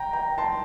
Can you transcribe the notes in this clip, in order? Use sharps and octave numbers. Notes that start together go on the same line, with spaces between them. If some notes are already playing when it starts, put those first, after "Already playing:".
Already playing: G5 A#5
G5 A#5
A5 C6